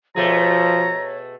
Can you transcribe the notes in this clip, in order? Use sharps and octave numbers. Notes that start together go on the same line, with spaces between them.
B2 F3 A3 G#4 C#5 A#5